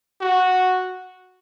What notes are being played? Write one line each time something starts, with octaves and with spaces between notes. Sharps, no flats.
F#4